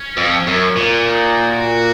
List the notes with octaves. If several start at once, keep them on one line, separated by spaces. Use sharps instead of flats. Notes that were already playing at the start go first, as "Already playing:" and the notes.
Already playing: C#4
F2
F#2
A#2
D#4
F#4